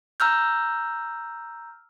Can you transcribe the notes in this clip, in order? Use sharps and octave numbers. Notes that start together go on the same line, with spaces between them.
A#5 E6 F6 G6